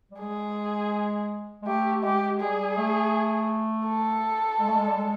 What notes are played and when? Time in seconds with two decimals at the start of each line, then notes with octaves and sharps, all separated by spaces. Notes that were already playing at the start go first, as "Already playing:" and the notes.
0.11 G3
0.20 G#3 G#4
1.62 G#3
1.67 A3 G4
2.03 G#3 G4
2.40 G3 G#4
2.77 A3
3.87 A4
4.59 G#3
4.69 A3
4.77 G#3
4.88 G3
4.97 G#3